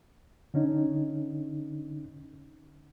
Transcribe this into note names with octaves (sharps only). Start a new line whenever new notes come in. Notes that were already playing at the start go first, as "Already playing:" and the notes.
D3 C#4 D#4